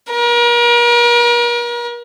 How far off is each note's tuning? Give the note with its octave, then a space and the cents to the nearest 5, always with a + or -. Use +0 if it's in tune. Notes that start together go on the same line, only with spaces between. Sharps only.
A#4 +40